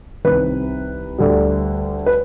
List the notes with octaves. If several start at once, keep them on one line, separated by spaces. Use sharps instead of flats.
C2 C3 D#3 B4
D2 D3 G3
B4